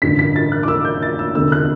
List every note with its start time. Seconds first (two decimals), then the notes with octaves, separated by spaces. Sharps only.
0.02 A1 G2 D3 B6
0.19 B6
0.36 A6
0.52 F#6
0.63 D6
0.68 E6
0.85 G6
1.02 A6
1.19 E6
1.35 E1 D2 C3 E6
1.52 F#6